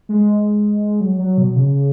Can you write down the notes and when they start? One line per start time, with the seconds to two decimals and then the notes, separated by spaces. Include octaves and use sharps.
0.09 G#3
1.01 F#3
1.19 F#3
1.38 B2
1.56 C#3